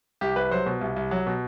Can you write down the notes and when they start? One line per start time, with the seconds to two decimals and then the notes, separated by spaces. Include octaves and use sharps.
0.21 C2 G4
0.36 C2 B4
0.51 F#3 C5
0.66 B2
0.81 C2
0.96 C2
1.11 F#3
1.27 B2